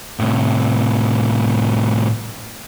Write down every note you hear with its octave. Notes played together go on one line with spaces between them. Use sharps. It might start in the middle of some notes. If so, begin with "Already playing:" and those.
A2 C3